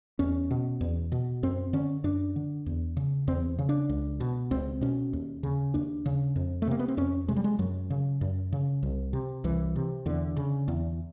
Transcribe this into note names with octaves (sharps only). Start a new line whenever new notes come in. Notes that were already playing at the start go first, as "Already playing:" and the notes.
E2 C#4
B2
E2
B2
F#2 C4
D3 C#4
F#2 D4
D3
E2
C#3
E2 C4
C#3
D4
C#2
B2
C#2 C4
B2 C#4
D#2
C#3
D#2 D4
C#3
F2
A3
C3 A#3
B3
C4
F2 C#4
C3 G#3
G3
G#3
F#2 F#3
C#3
F#2
C#3
C2
C3
C2 E3
C3
E2 D3
C#3
E2